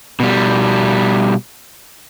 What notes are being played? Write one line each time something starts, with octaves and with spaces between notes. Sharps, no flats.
B2 G3